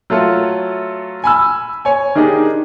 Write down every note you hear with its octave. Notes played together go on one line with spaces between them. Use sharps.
F#3 A3 F4 A4
G#5 B5 E6
C#5 G#5
D#3 D4 D#4 G4 G#4